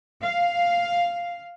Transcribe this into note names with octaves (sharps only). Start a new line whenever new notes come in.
F5